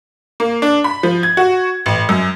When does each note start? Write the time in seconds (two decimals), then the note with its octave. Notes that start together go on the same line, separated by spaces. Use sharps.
0.40 A#3
0.62 D4
0.84 B5
1.03 F3
1.23 G#6
1.37 F#4
1.86 A1
2.09 F#2